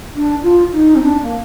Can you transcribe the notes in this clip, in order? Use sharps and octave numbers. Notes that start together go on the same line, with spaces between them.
D4
F4
D#4
C4
D4
A#3